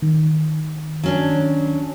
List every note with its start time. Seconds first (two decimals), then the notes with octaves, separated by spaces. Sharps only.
0.02 D#3
1.04 F#3 C#4 D4